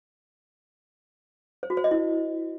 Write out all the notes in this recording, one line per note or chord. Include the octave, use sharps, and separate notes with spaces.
C5
F#4
C5
D#5
E4